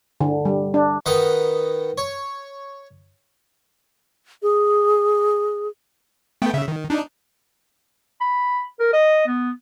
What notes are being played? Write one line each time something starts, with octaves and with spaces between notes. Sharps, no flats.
D3
G3
D4
D#3 B3 D#5 F#5 A#5
C#5
G#4
A3 B3 G5
C#3 E5
D#3
D4 D#4
B5
A#4
D#5
B3